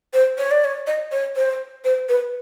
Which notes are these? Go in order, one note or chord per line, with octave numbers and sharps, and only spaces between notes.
C5
C#5
D5
C#5
D#5
C#5
C5
C5
B4